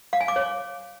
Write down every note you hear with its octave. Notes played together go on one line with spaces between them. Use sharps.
F5
G#5
D6
C#5